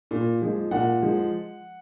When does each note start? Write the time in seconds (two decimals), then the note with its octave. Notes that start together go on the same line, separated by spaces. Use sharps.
0.11 A#2
0.42 F3 G#3
0.71 A#2 F#5
1.03 F3 G#3